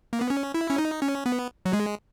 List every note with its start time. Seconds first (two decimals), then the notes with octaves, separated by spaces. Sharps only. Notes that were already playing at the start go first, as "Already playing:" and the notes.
0.13 A#3
0.21 B3
0.30 C#4
0.54 E4
0.70 C#4
0.78 D#4
1.02 C#4
1.26 B3
1.65 F#3
1.73 G#3